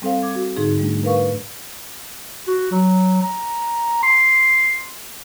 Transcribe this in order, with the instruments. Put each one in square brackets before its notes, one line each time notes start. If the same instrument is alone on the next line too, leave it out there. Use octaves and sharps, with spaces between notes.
[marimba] G3 C4 A4 C5 F5
D6 G#6
F#4
G#2 D3 D#4 G#4
G#2 G3 A3 D4
A#4 B4 F5 C#6
[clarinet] F#4
F#3
A#5
C6